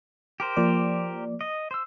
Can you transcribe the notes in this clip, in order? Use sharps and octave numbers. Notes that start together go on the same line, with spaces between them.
G4 A#4 C5
F3 A#3 D5
D#5
C5 E6